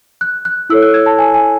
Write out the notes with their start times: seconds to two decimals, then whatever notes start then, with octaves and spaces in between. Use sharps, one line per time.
0.21 F#6
0.45 F#6
0.70 E4 A4 C#5 E6
0.82 F#6
0.94 G#6
1.06 A5
1.19 G#5
1.34 G#5